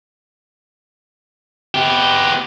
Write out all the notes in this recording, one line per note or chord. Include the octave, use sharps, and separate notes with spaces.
B3 G4